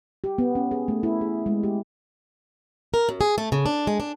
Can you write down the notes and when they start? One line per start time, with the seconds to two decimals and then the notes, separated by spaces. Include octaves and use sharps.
0.24 G4
0.38 B3
0.55 C#4
0.71 G#4
0.88 A3
1.03 E4
1.21 G#4
1.46 G#3
1.63 G4
2.94 A#4
3.09 F#2
3.21 G#4
3.38 A3
3.52 C#3
3.66 D4
3.87 G#3
4.00 D4